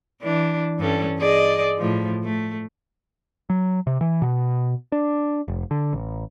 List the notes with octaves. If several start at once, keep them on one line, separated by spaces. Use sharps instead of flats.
E3 D4
G2 C#4 A4
G#4 D5 D#5
A2 F3
A3
F#3
C3
E3
B2
D4
F1
D3
A1